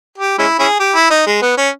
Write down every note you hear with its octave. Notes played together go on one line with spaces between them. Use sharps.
G4
G#3 C#4 E4
C#4 E4 G#4
G4
E4
D#4
G#3
B3
C#4